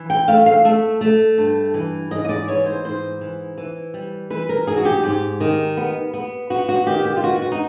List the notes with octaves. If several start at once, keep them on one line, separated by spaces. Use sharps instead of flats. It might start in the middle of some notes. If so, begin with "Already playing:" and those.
Already playing: E3
G5
A3 F5
F5
A3 E5
A3
G2
E3
G#2 D#5
D#5
D5
E3 C#5
C5
G#2 C5
E3
E3
G3
E3 B4
A#4
G#2 G#4
F#4
G4
G#2 G4
D#3
B3
B3
B3 F#4
F#4
D#3 G4
G4
F4
B3 F#4
F#4
D#4